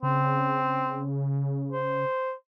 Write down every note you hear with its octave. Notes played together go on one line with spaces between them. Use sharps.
C#3 C4
C5